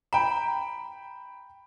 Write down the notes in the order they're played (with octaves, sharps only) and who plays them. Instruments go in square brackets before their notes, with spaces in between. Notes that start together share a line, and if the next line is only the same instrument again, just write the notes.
[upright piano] G5 B5 [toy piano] A#5